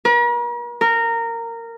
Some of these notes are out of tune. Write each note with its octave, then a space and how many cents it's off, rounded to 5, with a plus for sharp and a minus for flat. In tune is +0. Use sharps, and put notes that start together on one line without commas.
A#4 +45
A#4 -15